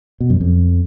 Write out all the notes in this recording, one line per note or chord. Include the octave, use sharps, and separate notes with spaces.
B2
F#2
F2